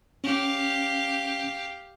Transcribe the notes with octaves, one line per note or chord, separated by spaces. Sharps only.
C#4 G4 F5